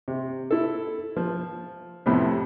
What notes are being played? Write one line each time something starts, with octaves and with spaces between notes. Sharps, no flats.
C3
E4 A4
F3
F2 A2 C3 B3